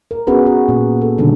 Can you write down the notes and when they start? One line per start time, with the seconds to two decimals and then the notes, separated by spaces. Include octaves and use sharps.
0.11 A#4
0.27 B3 C#4 F#4 G#4 A#4 B4
0.46 F#4
0.69 A#2 C#4
1.01 A4
1.18 B2 D3 D#3 G3